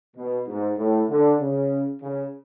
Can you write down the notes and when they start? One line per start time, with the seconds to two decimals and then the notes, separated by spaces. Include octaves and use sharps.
0.16 B2
0.47 G#2
0.78 A2
1.09 D3
1.40 C#3
2.01 C#3